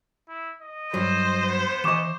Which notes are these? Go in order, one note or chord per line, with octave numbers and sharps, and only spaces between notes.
E4
D#5
G2 F#3 C5
B3
E3 D#5 C#6 D6 E7